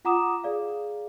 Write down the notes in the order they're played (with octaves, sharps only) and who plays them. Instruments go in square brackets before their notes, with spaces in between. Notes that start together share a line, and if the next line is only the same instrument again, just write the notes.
[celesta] F4 F#5 A#5 D6 D#6 E7
G#4 D5 F5